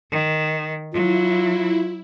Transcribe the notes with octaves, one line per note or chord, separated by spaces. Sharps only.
D#3
F#3 E4 F4